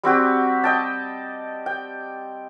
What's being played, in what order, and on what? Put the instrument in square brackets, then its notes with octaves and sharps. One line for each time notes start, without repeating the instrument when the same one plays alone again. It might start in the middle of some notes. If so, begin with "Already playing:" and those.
[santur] G3 C4 F#4 G4
D#5 G5 A5
G5